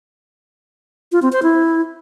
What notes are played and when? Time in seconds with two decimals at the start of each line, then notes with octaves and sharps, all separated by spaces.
1.12 F4
1.22 C4
1.33 C5
1.43 E4